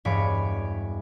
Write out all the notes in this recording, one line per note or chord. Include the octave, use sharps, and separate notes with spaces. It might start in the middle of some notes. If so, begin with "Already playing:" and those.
E1 G2 C#5 G#5 B5 D6